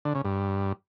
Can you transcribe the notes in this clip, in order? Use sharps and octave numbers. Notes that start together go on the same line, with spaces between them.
D3
C#3
G2